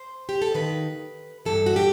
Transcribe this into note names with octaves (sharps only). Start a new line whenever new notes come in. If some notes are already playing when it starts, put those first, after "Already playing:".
Already playing: C5
G4
A4
D#2 D#3 B4
G2 E3 A4
F#4
G4